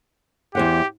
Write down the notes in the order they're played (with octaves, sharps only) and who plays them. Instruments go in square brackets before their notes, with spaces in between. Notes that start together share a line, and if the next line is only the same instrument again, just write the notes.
[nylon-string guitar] E2 C5 F#5 [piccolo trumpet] G4